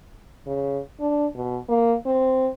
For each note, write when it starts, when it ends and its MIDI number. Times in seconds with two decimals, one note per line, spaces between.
0.46 0.78 49
1.00 1.26 62
1.35 1.57 47
1.69 1.95 58
2.06 2.48 60